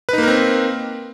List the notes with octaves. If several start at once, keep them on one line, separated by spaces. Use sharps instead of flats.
A#3 C4 D#4 A#4 B4